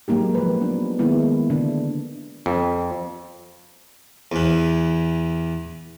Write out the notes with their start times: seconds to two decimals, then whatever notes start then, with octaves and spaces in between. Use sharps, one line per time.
0.08 F#3 G#3 A#3 D#4 G4
0.35 F3 B4
0.60 B3 D4
0.99 D#3 G#3 A#3 B3 E4
1.50 D3 D4
2.46 F2
4.32 E2 E3